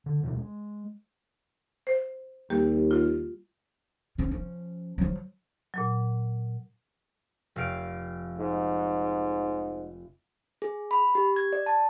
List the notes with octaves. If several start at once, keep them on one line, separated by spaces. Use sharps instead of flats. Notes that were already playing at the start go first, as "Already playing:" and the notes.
D3
D1 B2 E3 C#4
G#3
C5
D#2 G3 A#3 G4
F4
F3 C#4
F3 C#4
F3 F#3
A#2 F#3
F1 F5 D7
G#2
G#4
B5
G4
G#6
D5
A5